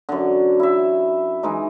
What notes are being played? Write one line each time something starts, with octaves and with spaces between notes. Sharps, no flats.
F#2 D3
E4 E5
E3 G#3 D#4